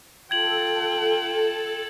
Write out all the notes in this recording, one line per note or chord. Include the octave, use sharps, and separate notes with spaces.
F4 A4 G5 G#6 F#7